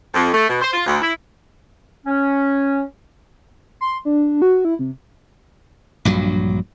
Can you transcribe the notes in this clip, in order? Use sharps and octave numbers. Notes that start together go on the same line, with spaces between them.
F2
A3
B2
C5
F4
D2
E4
C#4
C6
D4
F#4
E4
C3
A#1 G2 F#3